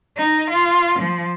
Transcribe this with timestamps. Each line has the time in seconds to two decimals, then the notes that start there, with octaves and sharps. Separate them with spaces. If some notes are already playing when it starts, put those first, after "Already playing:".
0.17 D#4
0.50 F4
1.00 F3